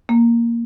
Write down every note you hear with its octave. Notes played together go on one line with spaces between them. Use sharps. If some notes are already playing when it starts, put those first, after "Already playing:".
A#3